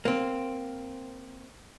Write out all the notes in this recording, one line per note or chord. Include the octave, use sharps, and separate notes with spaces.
A#3 C4